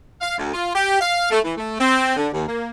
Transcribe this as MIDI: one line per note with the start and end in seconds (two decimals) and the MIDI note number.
0.21 0.36 77
0.38 0.52 38
0.53 0.71 65
0.75 1.01 67
1.01 1.28 77
1.31 1.39 57
1.44 1.53 52
1.57 1.77 57
1.80 2.16 60
2.17 2.28 50
2.33 2.46 39
2.48 2.71 58